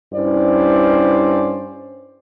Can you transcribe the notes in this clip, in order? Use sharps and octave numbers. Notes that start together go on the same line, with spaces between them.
G2 C#4 E4 C5 D5